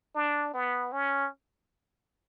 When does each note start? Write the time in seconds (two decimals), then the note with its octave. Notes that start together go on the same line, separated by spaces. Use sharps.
0.15 D4
0.54 B3
0.92 C#4